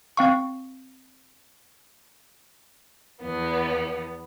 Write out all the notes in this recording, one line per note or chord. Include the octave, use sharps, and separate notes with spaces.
C4 F5 C#6
E2 B3